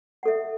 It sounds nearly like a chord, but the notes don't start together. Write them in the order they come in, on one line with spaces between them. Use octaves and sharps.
F#5 A4 E5